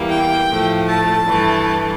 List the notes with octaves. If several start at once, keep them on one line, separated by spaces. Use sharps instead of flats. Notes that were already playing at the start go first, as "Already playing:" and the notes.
Already playing: E2 E3 G3 A#3
G5
A2 F3 A3
A5
G2 E3 A3